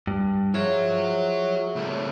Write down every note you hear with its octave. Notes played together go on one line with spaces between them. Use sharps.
G2
F3 F#4 G#4 C#5 E5
C#3 A3